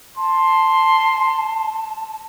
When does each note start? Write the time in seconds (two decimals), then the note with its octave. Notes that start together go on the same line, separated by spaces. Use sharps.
0.18 A5 C6